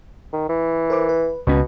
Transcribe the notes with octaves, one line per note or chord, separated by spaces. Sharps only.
D#3
E3
A#4 C5 D6
B4
C#2 B2 C#4 C#6